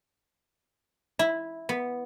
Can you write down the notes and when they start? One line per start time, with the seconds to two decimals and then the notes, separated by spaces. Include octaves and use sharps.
1.19 E4
1.69 B3